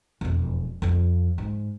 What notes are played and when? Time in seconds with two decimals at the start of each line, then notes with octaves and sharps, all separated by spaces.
0.21 E1 F2
0.82 F2 F3
1.38 G#2